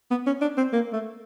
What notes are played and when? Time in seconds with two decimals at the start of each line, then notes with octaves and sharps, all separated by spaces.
0.11 B3
0.26 C#4
0.41 D4
0.57 C4
0.73 A#3
0.93 A3